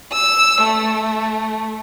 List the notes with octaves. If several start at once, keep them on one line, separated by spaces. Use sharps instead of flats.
E6
A3